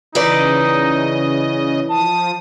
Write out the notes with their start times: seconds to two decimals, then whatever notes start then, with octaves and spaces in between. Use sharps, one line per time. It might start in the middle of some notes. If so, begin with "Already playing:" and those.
0.15 C#3 E3 D#4 B4 D5 D#5
1.90 F3 A5 D#6